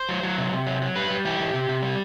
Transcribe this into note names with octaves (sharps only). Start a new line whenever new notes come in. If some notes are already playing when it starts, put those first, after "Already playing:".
Already playing: C5
F#3
F#3
C3
C3
F#3
F#3
G3 B4
G3
E3 G4
E3
C3
C3
G3